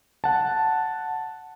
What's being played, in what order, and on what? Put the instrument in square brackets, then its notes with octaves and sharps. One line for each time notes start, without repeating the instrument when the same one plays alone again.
[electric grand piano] F#5 A5